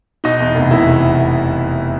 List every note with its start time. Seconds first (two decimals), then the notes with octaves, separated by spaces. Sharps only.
0.24 B2 D#4 D#5
0.40 E2
0.55 F1
0.71 F1 E4 E5
0.86 E2